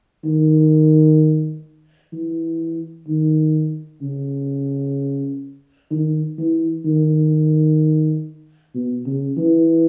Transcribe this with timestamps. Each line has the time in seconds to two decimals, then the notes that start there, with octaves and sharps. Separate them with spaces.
0.24 D#3
2.13 E3
3.08 D#3
4.02 C#3
5.91 D#3
6.38 E3
6.85 D#3
8.74 B2
9.06 C#3
9.38 E3